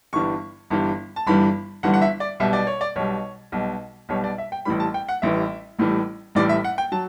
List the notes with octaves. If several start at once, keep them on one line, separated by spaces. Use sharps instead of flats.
G1 G2 E3 G3 C#6
G1 G2 E3 G3
A5
G1 G2 E3 G3 B5
G1 G2 E3 G3 F#5
F#5
E5
D5
B1 B2 G3 E5
D5
C#5
D5
B1 B2 G3 C#5
B1 B2 G3
B1 B2 G3 C#5
D5
E5
G5
A1 A2 E3 G3 B5
A5
G5
F#5
A1 A2 E3 G3 E5
A1 A2 E3 G3
A1 A2 E3 G3 D5
E5
F#5
G5
F#3 A5